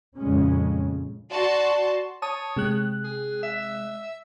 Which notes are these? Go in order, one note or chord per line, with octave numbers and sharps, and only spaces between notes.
F2 A#2 C#3 G#3 C#4
F#4 D5 A5 C6
C#5 A5 D#6
C3 G#3 F#6
G#4
E5